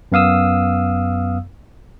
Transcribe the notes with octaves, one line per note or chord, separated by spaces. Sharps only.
F#2 B3 F5 D#6 E6